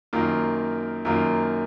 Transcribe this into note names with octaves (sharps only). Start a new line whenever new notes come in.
F#2 D#3 A#3 F4
F#2 D#3 A#3 F4